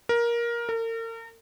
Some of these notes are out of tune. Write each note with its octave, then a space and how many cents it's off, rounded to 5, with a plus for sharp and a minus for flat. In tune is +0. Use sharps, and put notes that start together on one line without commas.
A#4 +15
A#4 -40